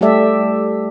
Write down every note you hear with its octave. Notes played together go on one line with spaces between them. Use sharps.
G3 A3 G4 A4 D5 E5